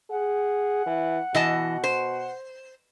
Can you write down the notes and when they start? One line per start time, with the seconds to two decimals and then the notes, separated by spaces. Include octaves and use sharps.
0.10 G#4 F#5
0.86 E3
1.35 B2 E3 D#5 A5
1.84 C5